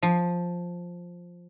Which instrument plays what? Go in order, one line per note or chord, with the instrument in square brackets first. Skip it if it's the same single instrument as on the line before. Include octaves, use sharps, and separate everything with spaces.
[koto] F3